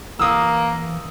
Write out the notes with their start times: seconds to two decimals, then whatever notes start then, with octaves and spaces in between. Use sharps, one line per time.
0.19 E3 A#3 D#6 E6